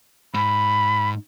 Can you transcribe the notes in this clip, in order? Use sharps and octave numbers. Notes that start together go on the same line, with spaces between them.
G#2 B5